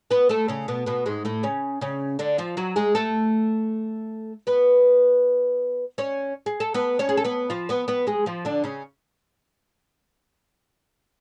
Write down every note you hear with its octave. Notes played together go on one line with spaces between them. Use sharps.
B3 B4
A3 A4
C#3 C#4
B2 B3
B2 B3
G#2 G#3
A2 A3
C#3 C#4
C#3 C#4
D3 D4
F3 F4
F#3 F#4
G#3 G#4
A3 A4
B3 B4
C#4 C#5
G#4
A4
B3 B4
C#4 C#5
G#4
A4
B3 B4
F3 F4
B3 B4
B3 B4
G#3 G#4
F3 F4
D3 D4
C#3 C#4